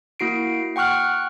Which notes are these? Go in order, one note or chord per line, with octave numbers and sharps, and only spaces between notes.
A#3 E4 F#4 C7 D7
F#5 G5 C#6 F6 F#6